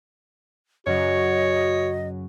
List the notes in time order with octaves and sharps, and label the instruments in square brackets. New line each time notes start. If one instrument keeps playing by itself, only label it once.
[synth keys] F#2 C#3 F#3 [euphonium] F#4 [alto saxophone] C#5 [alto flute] D#5